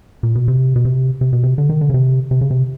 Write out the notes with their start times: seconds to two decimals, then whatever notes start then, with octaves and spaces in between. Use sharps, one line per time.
0.23 A#2
0.35 B2
0.48 C3
0.76 B2
0.85 C3
1.21 C3
1.33 B2
1.43 C3
1.58 D3
1.69 D#3
1.81 D3
1.90 C#3
1.94 C3
2.31 C3
2.41 C#3
2.51 C3